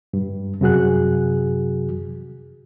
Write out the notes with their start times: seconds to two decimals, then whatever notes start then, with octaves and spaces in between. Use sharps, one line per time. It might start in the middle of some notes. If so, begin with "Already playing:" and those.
0.13 G2
0.61 F#2 C3 F#3 F#4 G#4 F#6